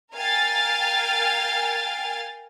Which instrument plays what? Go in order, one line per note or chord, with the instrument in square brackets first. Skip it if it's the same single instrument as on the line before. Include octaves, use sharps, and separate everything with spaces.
[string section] A#4 F5 G5 G#5 F6 A6